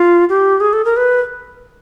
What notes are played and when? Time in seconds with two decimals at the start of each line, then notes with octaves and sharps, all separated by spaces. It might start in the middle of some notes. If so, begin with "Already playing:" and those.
Already playing: F4
0.29 G4
0.60 G#4
0.73 A4
0.85 A#4
0.97 B4